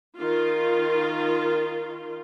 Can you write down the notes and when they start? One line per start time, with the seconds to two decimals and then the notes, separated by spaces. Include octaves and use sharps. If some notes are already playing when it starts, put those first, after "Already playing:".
0.19 D#3 F4